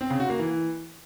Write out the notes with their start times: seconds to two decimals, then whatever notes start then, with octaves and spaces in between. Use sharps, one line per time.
0.01 C4
0.10 C#3
0.20 F#4
0.30 A#3
0.39 E3